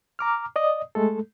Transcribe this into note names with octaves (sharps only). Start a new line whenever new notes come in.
A#5 D6 F6
D5 D#5 D#6
G#3 A3 A4